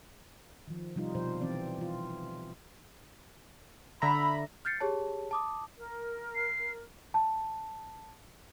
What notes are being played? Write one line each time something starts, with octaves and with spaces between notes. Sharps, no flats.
D#3 F3
C3 F3 G3 D#4 F4
B2 F3 C5
E3 C4 D5
E3 F4
D3 E5 A#5 B5
F6 G6 A6 C7 C#7
G4 G#4 C#5 A5
A5 D6 D#6
A#4
C7
A5